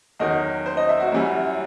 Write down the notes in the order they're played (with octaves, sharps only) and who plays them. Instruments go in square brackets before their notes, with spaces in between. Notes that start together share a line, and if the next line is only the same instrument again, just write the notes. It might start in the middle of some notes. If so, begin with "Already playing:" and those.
[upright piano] E2 D#3 F#3 D#5
C5
D#5
E5
F#4
F#2 E3 G3